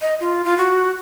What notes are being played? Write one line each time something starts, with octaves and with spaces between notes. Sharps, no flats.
D#5
F4
F4
F#4